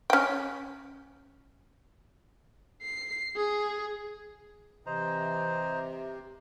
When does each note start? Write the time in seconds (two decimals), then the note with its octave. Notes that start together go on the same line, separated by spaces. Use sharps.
0.10 C#4 G5
2.82 C7
3.36 G#4
4.86 C3 E3 C5 D#5 A#5